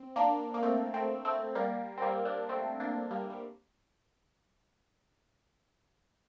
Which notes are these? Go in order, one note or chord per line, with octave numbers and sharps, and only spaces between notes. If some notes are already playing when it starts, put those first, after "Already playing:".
Already playing: C4
A#3 D4
A#3
A3 C4
A3 C4
A3 C4
G3 A#3
C4
G3 A#3
A#3 D4
A3 C4
A#3 D4
G3 A#3
G3